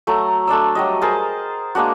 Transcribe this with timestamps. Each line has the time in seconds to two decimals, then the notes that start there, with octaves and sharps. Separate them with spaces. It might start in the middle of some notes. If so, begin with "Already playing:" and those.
0.07 F#3 A3 A4 A#5
0.47 A3 D4 D5 E6
0.75 F#3 G3 D#5
1.02 G#4 A#4 C5 A5
1.75 G#3 A#3 D4 F#4